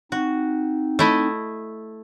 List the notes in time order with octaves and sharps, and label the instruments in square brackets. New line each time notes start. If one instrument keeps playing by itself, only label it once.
[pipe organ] C4 D#4 [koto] F#4
[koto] A3 E4 D#5